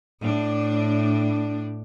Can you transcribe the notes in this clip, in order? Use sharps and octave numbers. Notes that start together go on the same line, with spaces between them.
A2 D4